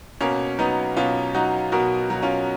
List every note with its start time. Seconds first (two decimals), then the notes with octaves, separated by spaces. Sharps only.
0.21 B2 A#3 C#4
0.59 F#3 B3 D#4
0.97 B2 C#4 F4
1.35 F#3 D#4 F#4
1.72 B2 F#4 A#4
2.10 F#3
2.23 C#4 F4